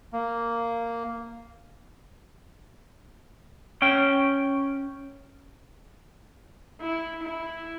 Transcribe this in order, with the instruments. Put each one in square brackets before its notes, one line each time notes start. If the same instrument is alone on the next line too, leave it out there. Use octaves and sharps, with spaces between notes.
[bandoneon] A#3
[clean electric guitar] C#4 G5
[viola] E4
E4